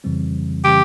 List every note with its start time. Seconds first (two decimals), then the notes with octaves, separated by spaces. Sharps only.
0.04 F2 C#3 E3 G3 C4
0.64 C#3 E3 G3 C4 G4